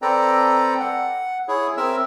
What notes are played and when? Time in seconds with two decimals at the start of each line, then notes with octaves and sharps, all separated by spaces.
0.02 C4 A4 B4 D5 G5 A#5
0.80 F#5
1.48 E4 G#4 C#5
1.77 C4 A#4 E5 E6